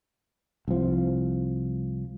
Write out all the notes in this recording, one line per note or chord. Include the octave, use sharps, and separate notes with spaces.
C2 F3